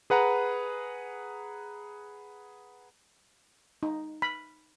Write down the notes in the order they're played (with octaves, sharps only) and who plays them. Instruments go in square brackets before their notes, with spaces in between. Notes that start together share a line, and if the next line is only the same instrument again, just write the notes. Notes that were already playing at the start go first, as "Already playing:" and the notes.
[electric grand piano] G#4 B4 F#5 A#5
[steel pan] D#4
B5